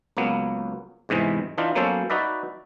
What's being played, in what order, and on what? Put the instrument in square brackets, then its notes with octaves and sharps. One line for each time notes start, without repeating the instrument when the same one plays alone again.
[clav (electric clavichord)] C#2 F#3 A#3 B3
E2 G#2 C3 E3 G#3
E3 D4 D#4 F4
F#3 A#3 B3 C#4 A4 C5
D#4 F#4 B4 D5 E5